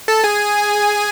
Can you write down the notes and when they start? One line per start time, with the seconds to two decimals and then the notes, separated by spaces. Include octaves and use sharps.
0.08 A4 A5
0.24 G#4 G#5